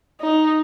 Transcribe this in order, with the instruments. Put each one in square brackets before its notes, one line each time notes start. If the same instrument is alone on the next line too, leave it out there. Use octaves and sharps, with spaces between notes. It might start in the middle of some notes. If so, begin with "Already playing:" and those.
[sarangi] D#4